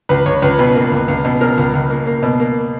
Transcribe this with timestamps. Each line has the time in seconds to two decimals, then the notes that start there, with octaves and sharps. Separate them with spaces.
0.09 C#2 B4
0.26 C#2 C#5
0.42 C#2 B4
0.59 B2 B4
0.75 A#3
0.92 C#2
1.08 C#2
1.25 B2
1.41 B2 A#4
1.58 C#2
1.74 C#2
1.90 A#3
2.07 A#3
2.23 B2
2.40 A#3